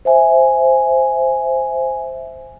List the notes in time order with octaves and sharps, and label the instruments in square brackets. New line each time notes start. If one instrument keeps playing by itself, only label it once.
[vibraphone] C5 E5 G#5